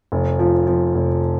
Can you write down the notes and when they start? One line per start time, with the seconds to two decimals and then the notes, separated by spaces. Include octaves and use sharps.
0.12 F1
0.39 F3
0.67 F3
0.95 F1